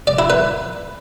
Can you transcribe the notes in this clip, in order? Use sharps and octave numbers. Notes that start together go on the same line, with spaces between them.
D5
E4
B4